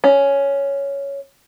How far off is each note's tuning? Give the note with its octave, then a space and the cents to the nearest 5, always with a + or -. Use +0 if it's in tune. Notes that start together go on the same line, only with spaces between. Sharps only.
C#4 +5